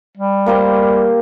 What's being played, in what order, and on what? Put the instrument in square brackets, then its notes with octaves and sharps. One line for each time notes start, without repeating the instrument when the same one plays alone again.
[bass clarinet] G3
[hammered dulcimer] A#3 G4 C5